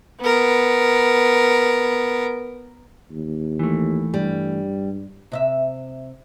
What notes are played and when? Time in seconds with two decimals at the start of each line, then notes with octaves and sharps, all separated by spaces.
0.21 B3 A#4
3.11 D#2
3.59 E3 A3
4.14 G2 G3
5.32 C3 D#5 E5